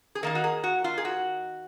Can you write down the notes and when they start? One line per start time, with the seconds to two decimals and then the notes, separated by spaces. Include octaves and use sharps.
0.15 G#4
0.23 D#3 A#3 D#4 A#4
0.35 F#4
0.44 G#4
0.64 F#4
0.84 F4
0.98 G#4
1.05 F#4